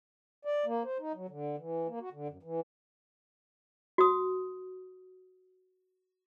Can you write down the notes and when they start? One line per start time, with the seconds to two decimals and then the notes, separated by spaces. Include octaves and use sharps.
0.45 D5
0.66 A#3
0.85 C5
1.00 D#4
1.14 F#3
1.29 D3
1.58 E3
1.88 A#3
2.00 F#4
2.13 D3
2.28 F#2
2.43 E3
3.98 F#4 D#6